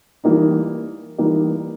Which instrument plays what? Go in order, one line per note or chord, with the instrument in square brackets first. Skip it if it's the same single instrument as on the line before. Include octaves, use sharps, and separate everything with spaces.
[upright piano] E3 G3 A#3 D#4
E3 G3 A#3 D#4